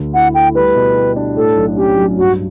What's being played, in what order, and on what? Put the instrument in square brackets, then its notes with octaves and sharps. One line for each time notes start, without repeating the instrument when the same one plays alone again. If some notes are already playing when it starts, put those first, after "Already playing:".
Already playing: [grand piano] D2 D3
[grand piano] E4 [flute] F#5
[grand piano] A3 [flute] G5
[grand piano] G3 [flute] B4
[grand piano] B2
G4
D4
[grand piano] A2 [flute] A4
[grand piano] B1
[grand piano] C#4 [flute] G4
[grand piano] F#3
[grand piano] G2 [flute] F#4